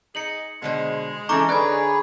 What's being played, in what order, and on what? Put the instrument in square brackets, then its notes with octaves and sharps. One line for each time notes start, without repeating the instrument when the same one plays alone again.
[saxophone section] D#4 G#4 [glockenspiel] C#7 F#7
[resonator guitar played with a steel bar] B2 D3 C5 [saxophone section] G#3
[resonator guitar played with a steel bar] E3 C#4 D#4 [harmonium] A4 [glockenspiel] A#5 C#6 D6
[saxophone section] D3 [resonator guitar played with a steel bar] D#4 D5 [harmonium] G#4 B4 C#5 [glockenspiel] F#6 G#6